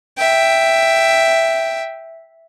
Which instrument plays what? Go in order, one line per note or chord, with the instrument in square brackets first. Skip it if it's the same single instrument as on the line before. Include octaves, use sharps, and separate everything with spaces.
[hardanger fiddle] E5 G5